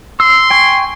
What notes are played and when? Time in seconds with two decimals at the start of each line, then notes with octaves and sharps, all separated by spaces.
0.20 C6 E6
0.50 G5 G#5 C#6